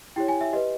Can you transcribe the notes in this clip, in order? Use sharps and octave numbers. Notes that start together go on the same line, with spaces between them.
E4 G4 C#5 G5
G#5
E5
G4 B4 D#5